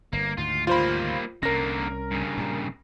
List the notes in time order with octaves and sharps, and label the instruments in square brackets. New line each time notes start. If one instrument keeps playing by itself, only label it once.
[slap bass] G1 [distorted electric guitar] A#3
[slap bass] D2 G#2 D#3 [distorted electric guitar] F4
[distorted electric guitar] G3 A#3 [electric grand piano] F4 C5 B5
[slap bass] C2 C#4 [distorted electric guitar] D3 A#3 [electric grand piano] A#4 A#6
[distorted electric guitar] G2 C#3
[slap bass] A#2 G3